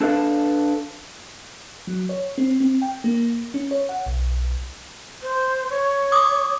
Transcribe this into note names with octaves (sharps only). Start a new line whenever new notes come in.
D4 A4 B4 F5
F#3
C#5
C4
C4
G5
A#3
C#4
C#5
F#5
B1
C5
C#5
D6 D#6